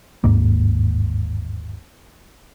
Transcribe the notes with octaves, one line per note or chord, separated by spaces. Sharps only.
G1 D#2 G#2 A#3